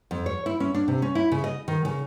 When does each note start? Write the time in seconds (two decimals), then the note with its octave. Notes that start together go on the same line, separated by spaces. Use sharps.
0.11 F2
0.26 C#5
0.46 E4
0.60 C#4
0.75 D4
0.88 C3
1.02 C#4
1.15 E4
1.32 C#3
1.44 D#5
1.68 D#3
1.85 C#3